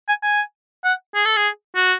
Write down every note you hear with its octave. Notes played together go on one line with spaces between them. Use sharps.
G#5
G#5
F#5
G#4
A4
G#4
F#4